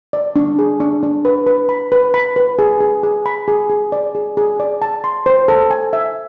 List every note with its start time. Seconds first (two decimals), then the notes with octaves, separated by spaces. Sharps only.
0.13 D5
0.36 D4
0.59 G#4
0.80 D4
1.03 D4
1.25 B4
1.47 B4
1.69 B5
1.92 B4
2.14 B5
2.36 B4
2.59 G#4
2.81 G#4
3.03 G#4
3.26 B5
3.48 G#4
3.70 G#4
3.92 D5
4.15 G#4
4.37 G#4
4.60 D5
4.82 A5
5.04 C6
5.26 C5
5.48 A4
5.71 G#5
5.93 E5